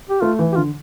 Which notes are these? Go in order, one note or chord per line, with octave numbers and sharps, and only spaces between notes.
G4
A3 F4
E3
G4
D3 F4